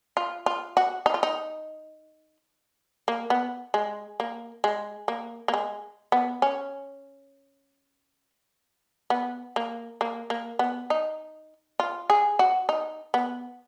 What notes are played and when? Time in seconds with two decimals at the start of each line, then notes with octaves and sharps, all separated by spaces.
0.17 F4
0.46 F4
0.77 F#4
1.06 D#4
1.14 F4
1.23 D#4
3.08 A#3
3.30 B3
3.74 G#3
4.20 A#3
4.64 G#3
5.08 A#3
5.48 A#3
5.54 G#3
6.12 B3
6.42 C#4
9.10 B3
9.56 A#3
10.01 A#3
10.30 A#3
10.59 B3
10.90 D#4
11.80 F4
12.10 G#4
12.39 F#4
12.69 D#4
13.14 B3